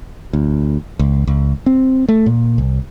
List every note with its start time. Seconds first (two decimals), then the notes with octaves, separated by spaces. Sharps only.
0.33 D2
0.99 C#2
1.27 C#2
1.66 C4
2.09 A3
2.26 A#2
2.58 C2